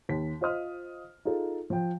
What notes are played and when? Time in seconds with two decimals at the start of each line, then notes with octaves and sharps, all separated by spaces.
0.09 D#2 B6
0.41 F4 C5 D#5 D#6 F6
1.25 D#4 F4 G#4 A4
1.70 F3 G5